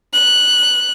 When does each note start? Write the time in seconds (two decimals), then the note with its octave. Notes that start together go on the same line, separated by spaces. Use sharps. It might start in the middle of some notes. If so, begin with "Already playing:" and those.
0.14 F#6